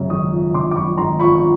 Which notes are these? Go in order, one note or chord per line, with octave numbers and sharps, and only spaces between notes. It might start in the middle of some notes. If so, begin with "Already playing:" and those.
Already playing: F#2 C#3
G#1 C#6 D#6
F3
C#3 C6 D6
D6
F#2 B5 C#6
G#1 A#5 C6
F3 B5 C#6
C#6